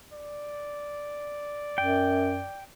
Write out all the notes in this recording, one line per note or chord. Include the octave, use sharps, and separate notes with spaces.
D5
F#2 G5